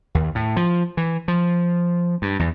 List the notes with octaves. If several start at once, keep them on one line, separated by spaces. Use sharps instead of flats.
D#2
A2
F3
E3
F3
G2
E2